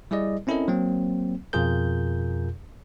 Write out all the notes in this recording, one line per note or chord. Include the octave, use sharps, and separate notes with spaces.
G3 E4 G#4 D5 D#5
C4 C#4 E4 A4 A#4 D#5
F#3 A#3 C4
F2 B2 F4 G#4 A#4 G6